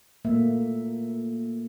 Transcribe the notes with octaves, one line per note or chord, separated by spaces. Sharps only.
A#2 A3 A#3 E5